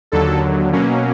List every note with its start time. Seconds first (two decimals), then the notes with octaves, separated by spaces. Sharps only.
0.12 D#2 D3 F#3 A4
0.72 B2 F#3 A#3 C#4